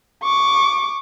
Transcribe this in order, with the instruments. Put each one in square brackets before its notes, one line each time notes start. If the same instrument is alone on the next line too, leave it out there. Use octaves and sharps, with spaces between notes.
[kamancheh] C#6 D6